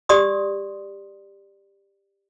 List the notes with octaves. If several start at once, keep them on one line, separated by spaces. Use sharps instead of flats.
G4 D5 C6 D#6